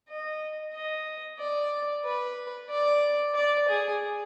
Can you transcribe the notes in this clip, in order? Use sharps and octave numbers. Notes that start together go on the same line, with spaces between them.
D#5
D#5
D5
B4
D5
D5
G#4